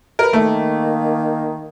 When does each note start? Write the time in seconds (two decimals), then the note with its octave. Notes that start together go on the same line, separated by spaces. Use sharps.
0.19 A#4 B4
0.33 D#3 A3 A#3